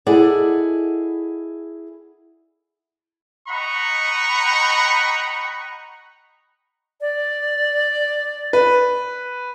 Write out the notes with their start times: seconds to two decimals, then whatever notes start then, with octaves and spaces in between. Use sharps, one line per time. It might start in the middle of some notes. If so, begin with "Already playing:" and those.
0.06 E4 G#4 A4 D5 D#5 F#5
3.48 D#5 F#5 G5 A#5 B5 C#6
7.01 D5
8.53 B4